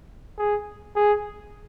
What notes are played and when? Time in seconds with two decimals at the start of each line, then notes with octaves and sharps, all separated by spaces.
0.38 G#4
0.96 G#4